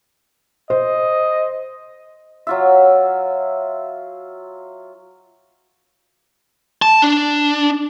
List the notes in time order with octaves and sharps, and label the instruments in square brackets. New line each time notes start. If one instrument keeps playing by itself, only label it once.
[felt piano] C5 [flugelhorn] D#5
[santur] F#3 F4 E5
[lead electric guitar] A5
D4